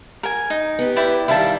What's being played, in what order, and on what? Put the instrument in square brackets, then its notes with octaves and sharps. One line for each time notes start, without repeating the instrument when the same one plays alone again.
[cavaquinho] A#4 G#5
D#4
[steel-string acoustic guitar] B3 G4
[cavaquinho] E4 D5 G5
[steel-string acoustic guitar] D#3 G3 [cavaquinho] E4 F5 A5